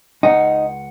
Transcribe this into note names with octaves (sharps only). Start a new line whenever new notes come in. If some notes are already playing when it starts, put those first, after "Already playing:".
C#2 D#4 F#5